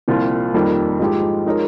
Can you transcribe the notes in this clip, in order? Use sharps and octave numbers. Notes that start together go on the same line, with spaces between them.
C2 A#2 F3 C4 F4
F2 D#3 G3 A#3 D#4
G#2 F3 G#3 D#4 G4
F3 G#3 D#4 A#4 C#5